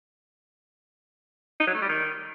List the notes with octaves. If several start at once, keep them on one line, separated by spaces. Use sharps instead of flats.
D#4
F#3
A3
G3
D#3